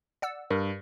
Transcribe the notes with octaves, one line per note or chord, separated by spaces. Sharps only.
D5 F#5 E6
G2 A#4